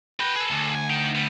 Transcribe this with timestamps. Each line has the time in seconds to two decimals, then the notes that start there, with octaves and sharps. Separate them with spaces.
0.20 F#4 B4 G5
0.36 G#4 A4
0.51 D2
0.75 G#5
0.90 D#4 G5
1.15 G3 B3